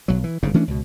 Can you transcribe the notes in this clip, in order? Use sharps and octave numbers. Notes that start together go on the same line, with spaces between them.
B1 F#3
E3
G1 G#2 C#3
E3 A3 C#4 D4
C#2 B2